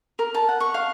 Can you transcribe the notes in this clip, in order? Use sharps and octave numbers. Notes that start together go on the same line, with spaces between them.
A#4
A5
F#5
C#6
F5